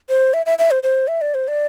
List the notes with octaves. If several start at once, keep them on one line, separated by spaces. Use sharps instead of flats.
C5
E5
E5
E5
C5
C5
E5
D5
C5
D5